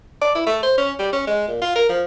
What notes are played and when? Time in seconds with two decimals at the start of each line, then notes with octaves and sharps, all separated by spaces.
0.22 D5
0.35 E4
0.46 A3
0.63 C5
0.78 C#4
0.99 G3
1.13 C#4
1.27 G#3
1.48 A#2
1.62 F4
1.76 A#4
1.89 F3